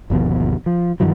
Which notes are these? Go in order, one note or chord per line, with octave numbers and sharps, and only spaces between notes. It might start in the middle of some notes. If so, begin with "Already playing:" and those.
G1 D#2 B2 F3
F3
G2 D#3 E3 F#3